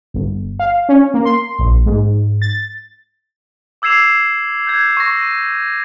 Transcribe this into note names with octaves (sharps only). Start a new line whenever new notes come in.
G1
F5
C#4
A#3
C6
A#1
G#2
A6
D6 E6 G#6 C7 E7 F7
G6 G#6
C#6 A#6
D#7